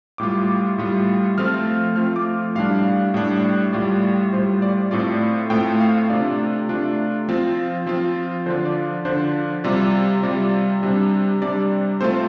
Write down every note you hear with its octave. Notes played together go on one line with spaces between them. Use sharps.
A2 G3 F4 D6
A2 G3 F4
F3 A3 C4 F4 F6
F3 A3 C4 F4 F6
D6
A2 G3 D4 F5
A2 G3 D4
A2 G3 F4 D5
A2 G3 F4 C5
D5
A2 A3 C4 F4 D5
A2 A3 C4 F4 G5
F5
C3 A3 D4 F4 D5
C3 A3 D4 F4
F3 C4 F4
F3 C4 F4
D3 F3 D4 F4 C5
D5
D3 F3 D4 F4 C5
C3 G3 F4 D5
C3 G3 F4 D5
C3 G3 D4
C3 G3 D4 D5
C3 A3 C4 F4 C5